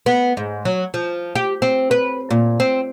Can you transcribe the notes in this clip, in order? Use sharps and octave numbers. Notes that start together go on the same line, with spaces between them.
B3
G#2
F#3
F3
G4
C4
B4
A#2
C4